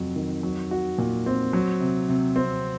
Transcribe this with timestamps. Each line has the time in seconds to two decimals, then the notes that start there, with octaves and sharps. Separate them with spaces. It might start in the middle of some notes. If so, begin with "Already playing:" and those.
Already playing: F2 C3 F#3
0.16 D#3
0.43 F#3
0.71 F#4
0.98 A#2
1.26 C4
1.53 F#3
1.80 C3
2.09 C3
2.36 C4